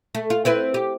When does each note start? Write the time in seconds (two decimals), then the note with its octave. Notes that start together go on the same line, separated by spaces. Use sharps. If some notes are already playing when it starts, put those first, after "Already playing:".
0.15 A3
0.30 F4
0.45 C4 E4 B4
0.74 G4